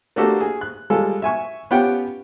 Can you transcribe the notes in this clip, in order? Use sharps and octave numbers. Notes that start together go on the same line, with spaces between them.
A3 A#3 D4 F#4 G4 A4
G#4
F#6
G3 G#3 F4 A4
E5 G#5 C#6
B3 C#4 F4 G4 F#5 G5